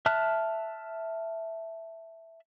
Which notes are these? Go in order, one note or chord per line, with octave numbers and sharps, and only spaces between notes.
E5 A5 F6 F#6